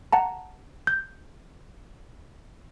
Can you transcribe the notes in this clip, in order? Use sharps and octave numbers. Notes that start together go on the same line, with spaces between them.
F#5 A5 A#5
G6